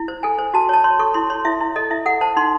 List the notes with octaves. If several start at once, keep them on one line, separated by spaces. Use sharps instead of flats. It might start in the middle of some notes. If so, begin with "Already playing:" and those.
Already playing: E4
C5
A4 G#5
C5
F#4 A5
C#5 A5
C#5 C6
A4 C#6
E4 C6
C#5 C6
E4 E5
E4
A4 D#5
E4 E5
A4 F#5
C5 A5
D#4 C6